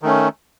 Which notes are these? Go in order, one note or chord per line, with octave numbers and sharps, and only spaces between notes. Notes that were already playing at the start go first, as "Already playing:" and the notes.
D#3 A3 C#4